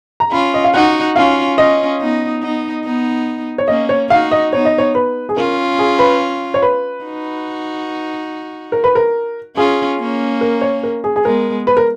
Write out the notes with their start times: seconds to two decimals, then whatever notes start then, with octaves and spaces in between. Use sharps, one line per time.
0.20 A#5
0.32 C#4 F4 B5
0.54 D#5
0.64 F5
0.74 D#4 F#4 F#5
1.16 C#4 F4 F5
1.58 C#4 F4 D#5
2.00 B3 D#4
2.42 B3 D#4
2.85 B3 D#4
3.58 C#5
3.68 A#3 C#4 D#5
3.89 C#5
4.10 D#4 F#4 F5
4.31 D#5
4.53 B3 D#4 C#5
4.65 D#5
4.78 C#5
4.95 B4
5.29 G#4
5.37 C#4 F4 A#4
5.79 G#4
5.99 B4
6.54 C#5
6.62 B4
7.04 D#4 F#4
8.72 A#4
8.84 B4
8.95 A#4
9.56 C#4 F4 G#4
9.99 A#3 C#4
10.41 A#4
10.61 C#5
10.83 A#4
11.04 G#4
11.16 G#4
11.25 G#3 B3 A#4
11.67 B4
11.77 A#4